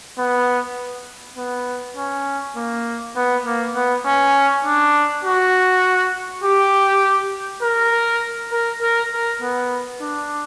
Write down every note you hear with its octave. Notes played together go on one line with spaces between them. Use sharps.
B3
B3
C#4
A#3
B3
A#3
B3
C#4
D4
F#4
G4
A#4
A#4
A#4
A#4
B3
D4